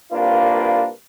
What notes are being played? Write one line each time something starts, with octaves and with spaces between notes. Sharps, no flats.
C2 A#3 D4 F4 B4